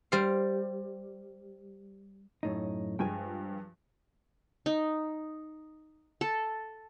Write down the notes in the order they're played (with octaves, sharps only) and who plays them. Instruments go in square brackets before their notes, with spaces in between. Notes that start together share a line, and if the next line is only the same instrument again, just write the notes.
[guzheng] G3 C5 F5
[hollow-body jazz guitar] F#2 A2 D#4
[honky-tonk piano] G2 F3 G#3 [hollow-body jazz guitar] G5 G#5
[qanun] D#4
A4